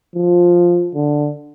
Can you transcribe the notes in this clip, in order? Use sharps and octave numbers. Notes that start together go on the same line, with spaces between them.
F3
D3